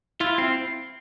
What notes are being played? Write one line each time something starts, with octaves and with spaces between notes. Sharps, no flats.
E4 F4
C4 E4